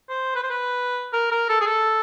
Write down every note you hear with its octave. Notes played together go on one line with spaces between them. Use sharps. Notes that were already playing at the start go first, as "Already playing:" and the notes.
C5
B4
C5
B4
A#4
A#4
A4
G#4
A4